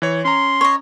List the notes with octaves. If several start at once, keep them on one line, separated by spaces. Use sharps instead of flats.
E3 C#5
C#4 A#5 C6
C#5 D#5